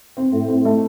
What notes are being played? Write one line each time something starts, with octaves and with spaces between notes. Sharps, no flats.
C4
A2
C4
A3